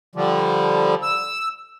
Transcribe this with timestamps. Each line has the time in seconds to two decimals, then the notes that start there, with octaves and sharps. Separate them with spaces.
0.15 D3 F3 G3
1.03 E6